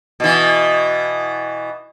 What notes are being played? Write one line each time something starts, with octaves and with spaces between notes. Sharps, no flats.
B2 E3